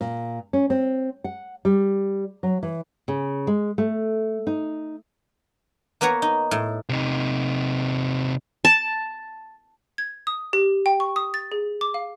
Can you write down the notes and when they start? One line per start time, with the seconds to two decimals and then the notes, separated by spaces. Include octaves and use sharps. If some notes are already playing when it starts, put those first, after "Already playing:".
0.01 A#2
0.53 C#4
0.70 C4
1.24 F#5
1.65 G3
2.43 F#3
2.63 E3
3.08 C#3
3.47 G#3
3.78 A3
4.47 D#4
6.01 A#3 B3 B4 C#5 A#5
6.22 D#4
6.51 A2
6.89 C3 D#4
8.65 A5
9.98 G#6
10.27 D#6
10.53 G4
10.86 G5
11.00 C#6
11.16 D#6
11.34 A6
11.52 G#4
11.81 D6
11.94 F5